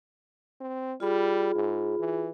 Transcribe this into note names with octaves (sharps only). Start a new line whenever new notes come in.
C4
G3 F4 G#4 B5
G#2
E3